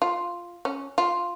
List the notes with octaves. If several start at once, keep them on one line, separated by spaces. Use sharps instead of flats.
F4
C#4
F4